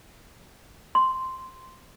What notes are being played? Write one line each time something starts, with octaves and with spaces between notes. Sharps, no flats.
C6